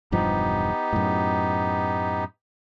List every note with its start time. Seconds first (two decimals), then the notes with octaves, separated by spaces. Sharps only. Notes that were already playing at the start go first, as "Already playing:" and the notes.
0.12 E1 G2 F3 B3 D#4 G4
0.93 F#2 A2